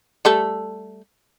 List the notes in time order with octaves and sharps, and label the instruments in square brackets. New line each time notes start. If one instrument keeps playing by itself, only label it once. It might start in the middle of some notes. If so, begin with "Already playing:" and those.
[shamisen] G3 A3 A4